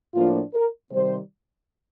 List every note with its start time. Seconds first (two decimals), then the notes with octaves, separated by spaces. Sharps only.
0.15 A2 F3 A#3 D4 F4
0.54 A#4
0.91 C3 D#3 G3 C5